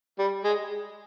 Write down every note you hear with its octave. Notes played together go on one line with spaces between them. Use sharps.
G3
G#3